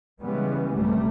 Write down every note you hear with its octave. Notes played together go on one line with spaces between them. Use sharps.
C#3 E3 G3 G#3 B3
A1 F#2 C3 G3 A3